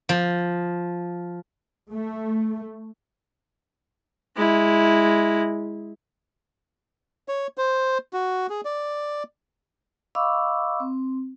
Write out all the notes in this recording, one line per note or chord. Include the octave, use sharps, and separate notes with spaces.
F3
A3
G#3 E4
C#5
C5
F#4
G#4
D5
D#5 F5 B5 C#6 D6 E6
C4